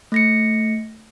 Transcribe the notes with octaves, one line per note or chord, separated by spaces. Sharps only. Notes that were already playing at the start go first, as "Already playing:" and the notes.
A3 A#6 C#7